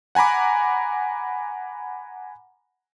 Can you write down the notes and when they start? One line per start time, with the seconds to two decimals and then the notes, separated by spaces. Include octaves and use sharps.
0.15 F#5 G#5 A#5 B5 D6